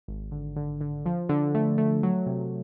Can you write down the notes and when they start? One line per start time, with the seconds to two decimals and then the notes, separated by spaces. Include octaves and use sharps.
0.08 G#1
0.31 D3
0.56 D3
0.81 D3
1.06 F3
1.29 D3
1.55 A3
1.78 A3
2.03 F#3
2.27 C3